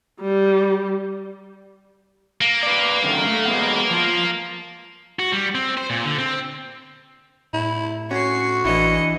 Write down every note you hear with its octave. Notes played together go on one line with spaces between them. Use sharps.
G3
A#3
B4 D5
F#2 D3 D#3
A3
F#3 G#3 B3
F3 F4
F#4
G3
C4
C5
A#2
D3
C4
A2 E4
C#4 F#4 C#6 C7
A1 E3 D4 E4 D#5 C#7